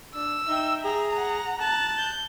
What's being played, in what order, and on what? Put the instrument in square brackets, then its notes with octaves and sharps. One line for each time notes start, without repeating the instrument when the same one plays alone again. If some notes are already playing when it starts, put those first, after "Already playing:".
[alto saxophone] D4 [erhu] E6
[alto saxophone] D#4 [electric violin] E5 G5
[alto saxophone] G#4 [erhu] A#5
[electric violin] F#5
[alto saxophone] A5 [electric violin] F#6 A6
[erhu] G6